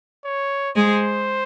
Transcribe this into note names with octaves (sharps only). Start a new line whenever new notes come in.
C#5
G#3 G#4 C5